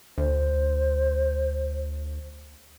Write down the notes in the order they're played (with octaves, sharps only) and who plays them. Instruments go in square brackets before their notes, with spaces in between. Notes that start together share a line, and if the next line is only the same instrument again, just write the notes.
[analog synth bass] D2 [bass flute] C5